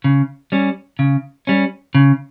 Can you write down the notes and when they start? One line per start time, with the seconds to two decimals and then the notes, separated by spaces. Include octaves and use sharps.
0.04 C#3
0.52 G3 C#4
0.99 C#3
1.47 G3 C#4
1.95 C#3